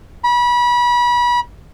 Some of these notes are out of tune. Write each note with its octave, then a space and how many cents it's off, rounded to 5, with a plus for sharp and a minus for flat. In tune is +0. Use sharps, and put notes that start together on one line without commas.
B5 -30